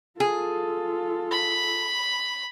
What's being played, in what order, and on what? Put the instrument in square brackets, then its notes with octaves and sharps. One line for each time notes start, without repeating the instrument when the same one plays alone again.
[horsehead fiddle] F4 A4 [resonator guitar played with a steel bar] G#4
[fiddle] B5